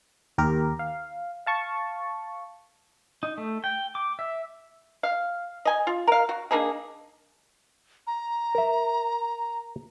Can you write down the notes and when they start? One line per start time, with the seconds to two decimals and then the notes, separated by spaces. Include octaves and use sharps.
0.38 D#2 G4 A#4
0.79 F5
1.46 F5 A5 C#6
3.23 D#4
3.38 A3
3.64 G5
3.95 D6
4.19 E5
5.03 F5
5.65 D#5 G#5
5.87 F4
6.07 A#4 F5
6.29 F#4
6.51 A#3 D4 D#4 G#4
8.07 A#5
8.55 A#4 E5